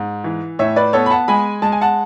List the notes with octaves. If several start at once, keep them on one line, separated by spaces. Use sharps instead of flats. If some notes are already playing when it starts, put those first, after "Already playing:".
Already playing: G#2
E3
A2 C#5 E5
B4 D5
B3 A4 C#5
B5
F#5 A5
G#3 G#5 B5
G#3 A5
G#5
F#5 A5